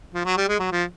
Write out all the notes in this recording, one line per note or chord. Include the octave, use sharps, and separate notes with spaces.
F3
F#3
G3
G#3
F#3
F3